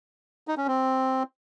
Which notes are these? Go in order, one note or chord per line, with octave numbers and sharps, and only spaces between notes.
D#4
C#4
C4